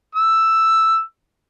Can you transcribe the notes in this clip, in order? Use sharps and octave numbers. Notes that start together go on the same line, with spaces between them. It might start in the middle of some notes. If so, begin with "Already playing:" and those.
E6